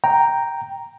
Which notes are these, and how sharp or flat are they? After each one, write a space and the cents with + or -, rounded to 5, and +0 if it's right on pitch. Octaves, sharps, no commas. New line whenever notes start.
G5 +0 A#5 +0